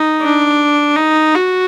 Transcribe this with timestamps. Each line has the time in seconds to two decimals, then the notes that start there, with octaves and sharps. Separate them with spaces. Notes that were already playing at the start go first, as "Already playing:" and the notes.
Already playing: D#4
0.22 D4
0.96 D#4
1.35 F#4